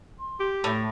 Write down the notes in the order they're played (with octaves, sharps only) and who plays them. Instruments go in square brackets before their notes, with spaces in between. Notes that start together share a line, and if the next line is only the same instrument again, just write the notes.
[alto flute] C6
[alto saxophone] G4
[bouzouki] A2 [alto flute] A3